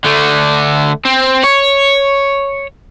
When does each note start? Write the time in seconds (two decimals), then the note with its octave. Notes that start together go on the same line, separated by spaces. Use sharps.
0.06 D3 A3
1.05 C4
1.44 C#5